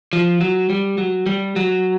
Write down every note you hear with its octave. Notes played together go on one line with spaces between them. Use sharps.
F3
F#3
G3
F#3
G3
F#3